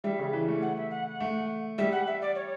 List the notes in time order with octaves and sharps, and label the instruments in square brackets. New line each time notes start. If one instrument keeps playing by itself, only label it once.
[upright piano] G3 [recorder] E5
[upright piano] C#3
E3
A3
[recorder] F#5
E5
F#5
[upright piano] A3
[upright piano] G3 [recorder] E5
[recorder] F#5
E5
D5
C#5